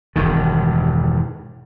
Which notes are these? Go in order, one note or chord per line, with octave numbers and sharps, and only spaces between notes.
E1 G2 D#3